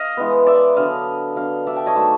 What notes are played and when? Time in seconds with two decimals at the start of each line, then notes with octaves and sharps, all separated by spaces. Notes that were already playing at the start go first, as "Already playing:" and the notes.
Already playing: D#5 F5
0.17 E3 G#3 B3
0.47 D5 E5
0.76 D3 F#3 B3 D#5 F5
1.36 D3 F#3 B3 D#5 F5
1.67 D5 E5
1.76 G5 A5
1.86 C#5 D#5
1.96 D#3 F#3 A3 C5 D5